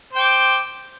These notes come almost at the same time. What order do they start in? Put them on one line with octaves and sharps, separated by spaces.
C5 G5 D6